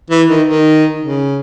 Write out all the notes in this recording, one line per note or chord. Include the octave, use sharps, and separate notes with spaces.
E3
D#3
D#3
C#3